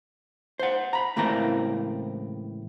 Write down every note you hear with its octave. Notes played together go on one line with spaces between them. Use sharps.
C5 F#5
A#5 B5
C#2 A2 E3 A#3 C4 A#5